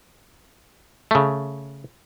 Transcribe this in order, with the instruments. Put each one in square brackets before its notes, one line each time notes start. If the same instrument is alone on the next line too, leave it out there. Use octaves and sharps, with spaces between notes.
[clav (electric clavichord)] C#3 A3